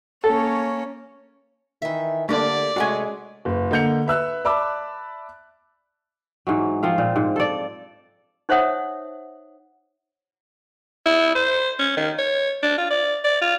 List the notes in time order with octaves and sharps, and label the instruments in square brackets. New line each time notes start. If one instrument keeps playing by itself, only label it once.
[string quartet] A#3 C#4 C#5 [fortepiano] A4
[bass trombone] D#3 [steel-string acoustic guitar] E3 E5
[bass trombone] D3 [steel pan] A3 D4 [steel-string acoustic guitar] A#3 G4 [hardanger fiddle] D5
[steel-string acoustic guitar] C3 A3 C#4 [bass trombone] G#3 [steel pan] F#4 G#5
[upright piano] F#1 B4
D3 A#3 D#5 G6 C#7 F7
B4 E5 E6 F#6
D5 E5 A5 B5 D6 E6
[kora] G#2 E3 F#3
F3 C4 F5
A#2
G#2
A4 D5
[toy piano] D#4 C5 C#5 E5 F#5 D#6
[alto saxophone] E4
C5
C#4
D#3
C#5
D4
F4
D5
D5
F4